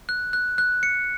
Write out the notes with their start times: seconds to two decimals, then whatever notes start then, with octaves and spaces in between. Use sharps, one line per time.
0.09 F#6
0.33 F#6
0.58 F#6
0.83 C#7